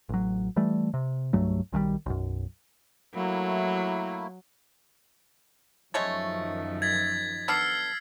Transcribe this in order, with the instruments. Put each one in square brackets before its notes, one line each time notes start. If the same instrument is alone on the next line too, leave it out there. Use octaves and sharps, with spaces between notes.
[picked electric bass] A1 F#3
E3 G3 A3
C3
C2 G2 F#3 A3
B1 D#3 F3 G3
B1 F#2
[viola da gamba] F#3 [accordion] A3 A#3 E4
[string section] F#2 D#3 F3 [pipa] G#3 A3 C#5
[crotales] G#6 A6 B6
[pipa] B3 D4 A4 [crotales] E6 F6 C7